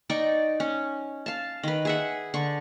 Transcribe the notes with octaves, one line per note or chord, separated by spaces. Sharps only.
D#4 D5 G5 C#6
C#4
F5 A5
D#3 B4
G#4 E5 F#5
D3 C#6